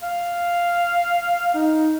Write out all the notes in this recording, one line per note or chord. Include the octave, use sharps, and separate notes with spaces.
F5
D#4